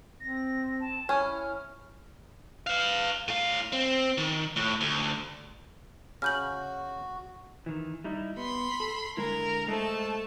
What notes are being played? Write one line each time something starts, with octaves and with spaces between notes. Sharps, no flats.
C4 A#6
A5
C#4 E4 G#5 F6
B4 F5
A2 F5
C4
D#3
A2
D2
C#3 F#4 F6 G6 F#7
D#3 E3
G3 D#4 E4
B3 B5 C6
A4
D3 G#3 E4 A#4
G#3 A3 C5 A5